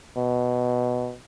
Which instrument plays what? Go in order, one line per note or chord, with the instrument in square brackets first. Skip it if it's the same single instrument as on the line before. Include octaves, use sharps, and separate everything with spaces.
[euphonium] B2